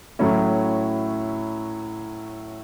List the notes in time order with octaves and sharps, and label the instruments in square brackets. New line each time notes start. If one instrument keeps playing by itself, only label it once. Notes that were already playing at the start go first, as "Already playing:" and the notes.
[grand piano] A2 F#3 A3 C#4 E4